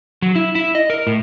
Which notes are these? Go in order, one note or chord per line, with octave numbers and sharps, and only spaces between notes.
F#3
E4
E4
D#5
A#4
A2